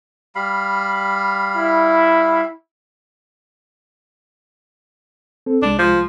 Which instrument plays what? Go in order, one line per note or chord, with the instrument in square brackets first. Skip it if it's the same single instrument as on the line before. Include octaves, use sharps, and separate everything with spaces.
[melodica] G3 F5 B5
[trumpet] E4
[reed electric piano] C4 A4
[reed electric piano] C2 G#3 [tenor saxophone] D4
[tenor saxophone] F3